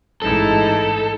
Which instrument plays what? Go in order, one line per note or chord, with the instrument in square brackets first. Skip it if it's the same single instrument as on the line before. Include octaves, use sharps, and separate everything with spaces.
[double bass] A1 G#2 [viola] D#4 E4 [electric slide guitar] A4